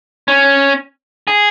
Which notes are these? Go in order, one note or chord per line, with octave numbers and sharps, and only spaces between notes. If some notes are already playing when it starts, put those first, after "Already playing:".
C#4
G#4